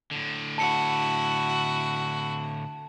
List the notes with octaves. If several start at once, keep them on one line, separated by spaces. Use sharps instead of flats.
A2 D3
E4 F#4 A5 C#7